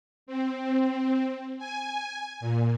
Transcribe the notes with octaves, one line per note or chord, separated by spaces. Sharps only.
C4
G#5
A#2